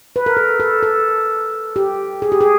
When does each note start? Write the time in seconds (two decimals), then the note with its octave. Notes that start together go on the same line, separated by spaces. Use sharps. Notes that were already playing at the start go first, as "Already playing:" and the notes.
0.16 B4
0.26 A#4
0.37 A4
0.60 A4
0.83 A4
1.76 G4
2.22 G#4
2.32 G4
2.41 G#4